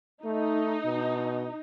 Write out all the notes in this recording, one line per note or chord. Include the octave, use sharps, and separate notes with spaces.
A3 D#4
B2